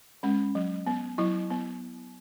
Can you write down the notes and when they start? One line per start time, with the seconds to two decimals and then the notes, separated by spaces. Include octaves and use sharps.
0.23 G#3 C#4
0.55 F#3
0.87 B3
1.18 F#3 E4
1.50 B3